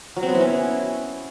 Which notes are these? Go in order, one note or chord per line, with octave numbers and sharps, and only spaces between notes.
F#3
C4
B3
E4
C#4